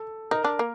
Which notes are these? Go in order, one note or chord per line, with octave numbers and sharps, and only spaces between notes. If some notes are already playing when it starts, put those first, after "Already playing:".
Already playing: A4
D#4 A#4
D4
A#3